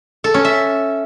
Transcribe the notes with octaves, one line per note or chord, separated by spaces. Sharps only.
A4
C#4
E5